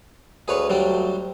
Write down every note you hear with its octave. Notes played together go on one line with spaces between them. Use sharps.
D2 G#4 B4 C#5
F#3 G3 D4